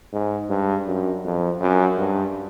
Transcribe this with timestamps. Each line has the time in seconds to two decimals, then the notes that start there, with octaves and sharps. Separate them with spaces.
0.13 G#2
0.50 G2
0.87 F#2
1.25 F2
1.61 F#2
1.98 G2